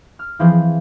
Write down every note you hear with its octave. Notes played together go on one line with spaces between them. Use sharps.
F6
E3 F3 C4 G#4 C5